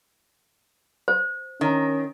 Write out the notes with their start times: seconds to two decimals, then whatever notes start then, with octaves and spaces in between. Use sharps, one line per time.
1.08 C5
1.61 D#3 C#4